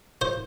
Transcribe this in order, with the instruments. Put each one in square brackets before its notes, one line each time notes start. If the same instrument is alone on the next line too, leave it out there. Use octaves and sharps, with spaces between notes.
[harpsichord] C5